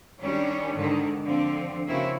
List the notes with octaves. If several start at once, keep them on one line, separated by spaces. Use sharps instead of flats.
D#3 G3 C#4 D4
G#2 D3 D#3
D3 F3 C4
C#3 A#3 C4 E4 F#4